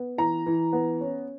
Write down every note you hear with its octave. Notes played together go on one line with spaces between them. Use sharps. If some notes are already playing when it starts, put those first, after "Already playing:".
Already playing: B3
E3 A#5
E3
B3
C#4